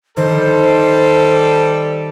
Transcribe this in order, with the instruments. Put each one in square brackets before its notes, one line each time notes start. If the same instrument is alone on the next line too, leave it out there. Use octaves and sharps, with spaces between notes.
[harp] D#3 [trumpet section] G3 A4 [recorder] C5